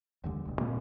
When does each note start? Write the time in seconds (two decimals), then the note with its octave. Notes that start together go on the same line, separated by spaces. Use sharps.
0.24 F1 D#2 D3 G#3
0.45 E1 B1
0.58 A#2 A#3 C4